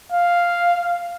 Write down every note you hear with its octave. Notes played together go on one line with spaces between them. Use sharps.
F5